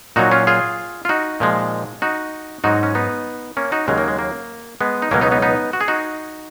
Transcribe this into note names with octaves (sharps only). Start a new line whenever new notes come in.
A#2 F#3 D#4 F#4
C#4 F4
F4 G#4
F4
D#4 F#4
A#2 F3 G#3
D#4 F#4
G#2 F#3 D#4 F#4
C#4
B3 D#4
A#3 C#4
D#4 F#4
D#2 C#3 F#3 G#3
A#3
G#3
A#3
G#3 B3
D#4
C#2 B2 F#3 A#3 C#4
B3 D#4
B3 D#4
B3 D#4
F#4
G#4
D#4 F#4